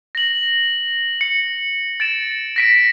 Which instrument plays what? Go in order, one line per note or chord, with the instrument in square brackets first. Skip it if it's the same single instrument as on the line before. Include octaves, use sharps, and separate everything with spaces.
[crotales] A#6 F#7
C#7
A6 D7 E7
A#6 B6 D7